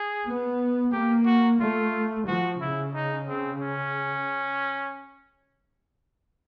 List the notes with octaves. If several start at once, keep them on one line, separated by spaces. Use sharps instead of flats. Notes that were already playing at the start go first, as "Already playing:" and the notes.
Already playing: G#4
B3
A#3 G4
F#4
A3 F4
F3 F#4
C#3 E4
D#4
C4
C#4